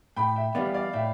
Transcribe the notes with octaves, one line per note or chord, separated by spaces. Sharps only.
A2 G5 B5
E5 G5
E3 G3 B3 D5 F5
D5 F5
A2 E5 G5